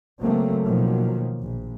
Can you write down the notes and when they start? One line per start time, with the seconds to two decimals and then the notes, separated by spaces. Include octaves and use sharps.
0.21 C#3 F#3 A3 A#3 C4
0.65 B2 D#3 F3 F#3 A#3
1.42 A#1